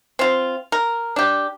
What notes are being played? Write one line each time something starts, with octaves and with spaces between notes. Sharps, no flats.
C4 F4
A#4
D4 G4